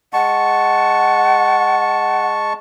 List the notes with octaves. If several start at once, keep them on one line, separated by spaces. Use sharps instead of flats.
G#3 F#5 A5 C#6